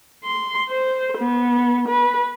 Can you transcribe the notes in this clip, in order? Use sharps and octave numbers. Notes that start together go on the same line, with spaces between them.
C6
C5
B3
B4